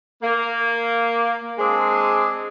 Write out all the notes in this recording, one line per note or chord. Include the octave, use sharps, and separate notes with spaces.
A#3
G#3 C4 D4 G#4